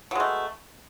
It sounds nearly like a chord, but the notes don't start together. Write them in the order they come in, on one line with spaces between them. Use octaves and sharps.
B2 G#3 A3